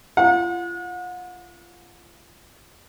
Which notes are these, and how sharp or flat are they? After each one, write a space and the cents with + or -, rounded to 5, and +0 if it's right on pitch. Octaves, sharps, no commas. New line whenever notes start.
F4 -30 F#5 -40